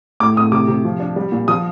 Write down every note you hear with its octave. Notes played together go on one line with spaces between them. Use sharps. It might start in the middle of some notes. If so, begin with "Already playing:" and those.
A2 D6
A2 D#6
C3 D6
C3
F3
D4
G3
A#2
F3 D#6